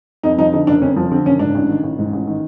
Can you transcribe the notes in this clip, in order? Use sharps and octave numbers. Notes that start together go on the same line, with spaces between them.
F2 D#4
F3 D#4
D3 D#4
F#1 D4
F2 C#4
F3
D3 C4
F#1 C#4
G#2 D4
A1
D#3
A1
G#2
A1
D#3